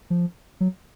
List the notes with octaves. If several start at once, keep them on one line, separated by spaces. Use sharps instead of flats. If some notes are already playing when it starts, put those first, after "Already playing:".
F3
F#3